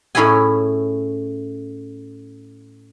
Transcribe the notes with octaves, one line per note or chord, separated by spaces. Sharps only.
A2 C#4 E4 G#4 G#5